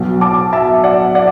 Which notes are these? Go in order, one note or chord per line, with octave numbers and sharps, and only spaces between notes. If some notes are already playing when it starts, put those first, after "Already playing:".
Already playing: B1 B2
A5 D6
E5 A5
D5 F#5
D5 F#5